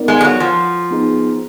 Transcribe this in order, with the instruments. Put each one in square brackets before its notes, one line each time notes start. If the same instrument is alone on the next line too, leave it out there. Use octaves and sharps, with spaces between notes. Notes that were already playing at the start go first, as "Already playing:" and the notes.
Already playing: [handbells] B3 D#4 A#4 D5
[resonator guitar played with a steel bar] G#3
G#3
F#3
F3
[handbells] B3 D#4 G#4